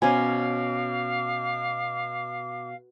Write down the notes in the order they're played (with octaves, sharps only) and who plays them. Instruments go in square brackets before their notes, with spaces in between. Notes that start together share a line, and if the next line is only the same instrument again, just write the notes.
[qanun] B2 C#4 [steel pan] C5 G#5 B5 [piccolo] F5 [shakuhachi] D6